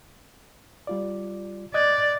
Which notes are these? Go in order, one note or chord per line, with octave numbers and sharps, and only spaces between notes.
G3 F4 D5
D5 D#5 F#6 G#6